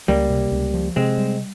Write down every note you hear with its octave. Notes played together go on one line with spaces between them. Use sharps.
C#2 G3 A#3
C3
C#2
F3
C3 G#3 C4
G3